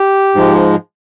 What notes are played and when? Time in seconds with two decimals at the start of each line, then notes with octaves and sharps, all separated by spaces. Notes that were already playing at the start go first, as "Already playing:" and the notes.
Already playing: G4
0.35 G#2 F3 G#3